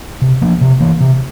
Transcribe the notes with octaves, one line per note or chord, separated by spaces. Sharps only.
C3
F3 A#3 D4
C3
E3 A#3
C3